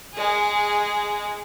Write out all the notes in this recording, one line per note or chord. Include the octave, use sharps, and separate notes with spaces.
G#3 G#4